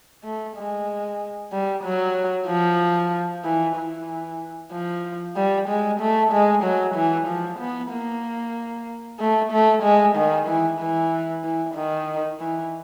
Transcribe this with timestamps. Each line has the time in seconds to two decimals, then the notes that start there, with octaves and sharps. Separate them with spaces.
0.24 A3
0.57 G#3
1.53 G3
1.84 F#3
2.48 F3
3.45 E3
3.76 E3
4.72 F3
5.36 G3
5.69 G#3
6.01 A3
6.32 G#3
6.63 F#3
6.95 E3
7.28 F3
7.59 B3
7.92 A#3
9.20 A3
9.52 A3
9.83 G#3
10.16 D#3
10.48 E3
10.80 E3
11.44 E3
11.75 D#3
12.40 E3